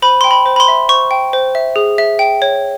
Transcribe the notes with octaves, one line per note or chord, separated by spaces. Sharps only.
C5 B5
G5 C6
B5
C5
B5
C6
E5
C5 C#6
G5
C5
E5
G#4
E5
G5
C#5